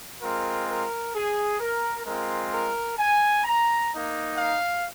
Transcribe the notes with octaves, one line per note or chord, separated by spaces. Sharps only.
G#3 C4 F4 A#4
A#4
G#4
A#4
G#3 C4 F4 A#4
A#4
G#5
A#5
A#3 D#4
F5